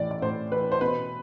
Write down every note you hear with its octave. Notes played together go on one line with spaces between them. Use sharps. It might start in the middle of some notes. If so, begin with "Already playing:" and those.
Already playing: A2 E3 D5
D5
A2 C5
E3 B4
C5
B2 B4